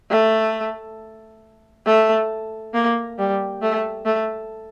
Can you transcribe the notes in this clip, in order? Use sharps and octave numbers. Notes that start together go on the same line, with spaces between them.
A3
A3
A#3
G3
A3
A3